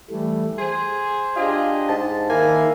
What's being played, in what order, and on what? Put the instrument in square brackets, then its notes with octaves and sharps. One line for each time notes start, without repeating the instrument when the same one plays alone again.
[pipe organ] E3 G3 A3
[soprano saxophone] G#4 [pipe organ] C5
[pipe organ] D4 G4 D#5 [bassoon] F4 [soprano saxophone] G#4
[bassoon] G#2 [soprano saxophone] A5
[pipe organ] D#3 E4 [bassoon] A#3 [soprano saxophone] G#5